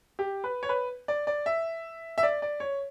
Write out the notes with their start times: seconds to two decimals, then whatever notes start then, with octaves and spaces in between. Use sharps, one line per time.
0.19 G4
0.44 B4
0.63 C#5
0.69 B4
1.08 D5
1.27 D5
1.46 E5
2.18 E5
2.23 D5
2.42 D5
2.60 C#5